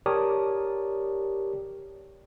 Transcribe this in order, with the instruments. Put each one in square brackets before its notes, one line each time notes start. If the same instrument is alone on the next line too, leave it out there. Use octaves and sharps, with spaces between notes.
[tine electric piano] G4 A#4 C#5 D5 A5 D#6